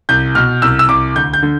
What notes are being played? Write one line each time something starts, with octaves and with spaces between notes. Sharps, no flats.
C2 G6
B2 F6
C2 E6
E6
C2 D6
D2 G6
G6
D3